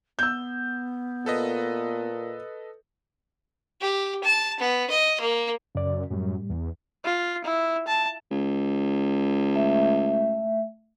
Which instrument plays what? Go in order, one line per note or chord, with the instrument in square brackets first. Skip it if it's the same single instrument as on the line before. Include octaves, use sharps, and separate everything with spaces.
[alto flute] B3 [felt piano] E6 G6
[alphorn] A#2 [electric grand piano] A4 B4 D#5
[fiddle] G4
A5
B3
D#5
A#3
[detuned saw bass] F#2 [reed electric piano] C#3 D5
[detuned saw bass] F#2 [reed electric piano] A2 G3
[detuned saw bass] E2
[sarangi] F4
E4
A5
[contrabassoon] C#2
[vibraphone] A3 E5